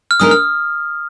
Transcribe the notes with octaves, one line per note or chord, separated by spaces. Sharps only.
F6
D3 G#3 B3 D#4 A#4 D#6
F6